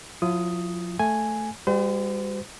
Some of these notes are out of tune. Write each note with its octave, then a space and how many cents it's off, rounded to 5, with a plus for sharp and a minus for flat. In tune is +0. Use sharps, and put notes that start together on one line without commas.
F3 +40 F4 -45 D#6 +5
A3 +0 G#5 +0
G3 +35 F#4 +0 C5 -40